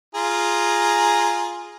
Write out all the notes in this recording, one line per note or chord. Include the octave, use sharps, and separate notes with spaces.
F4 G#4 A#5